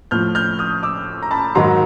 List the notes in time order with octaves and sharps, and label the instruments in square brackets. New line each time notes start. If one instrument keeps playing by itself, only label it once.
[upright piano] A2 F3 F6 G6
F6 G6
D#6 F6
D6 E6
A#5
A5 B5
G#2 D#3 F#3 A#5 C6